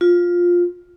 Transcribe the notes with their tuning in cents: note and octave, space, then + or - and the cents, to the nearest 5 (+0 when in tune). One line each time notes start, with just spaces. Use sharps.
F4 +10